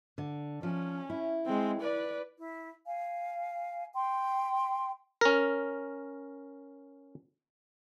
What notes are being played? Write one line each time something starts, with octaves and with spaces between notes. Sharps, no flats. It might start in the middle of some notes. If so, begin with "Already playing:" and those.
D3
F3 C#4
E4
G#3 C4
B4 D5
E4
F5 G#5
G5 C6
C#4 A#4